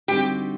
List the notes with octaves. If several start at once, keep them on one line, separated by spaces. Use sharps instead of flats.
D3 G3 C4 D#4 F#4 G4